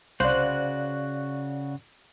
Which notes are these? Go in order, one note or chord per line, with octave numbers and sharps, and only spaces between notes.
C2 C#3 F#4 C5 D5 F5 F#6